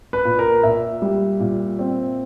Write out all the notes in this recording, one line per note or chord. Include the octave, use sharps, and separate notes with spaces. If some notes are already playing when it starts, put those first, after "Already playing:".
B4
A#2
A#4
A#2 E5
G3
A#2
C4